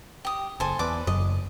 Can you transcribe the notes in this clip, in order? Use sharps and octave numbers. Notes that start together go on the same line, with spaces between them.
G4 D#6
F#1 A4 C5 G#5
E2 B4 D5 D6
F#1 F#2 D#5